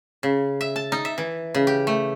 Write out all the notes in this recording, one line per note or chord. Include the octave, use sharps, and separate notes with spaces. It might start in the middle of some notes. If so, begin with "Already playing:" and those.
C#3
E5
A5
D#4
E5
E3
C#3
G4
A3